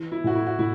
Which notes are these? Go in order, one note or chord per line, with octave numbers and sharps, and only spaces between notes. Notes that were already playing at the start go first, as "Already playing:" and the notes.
Already playing: E3
E4
A2 F#4
E4
F#4
A2 E4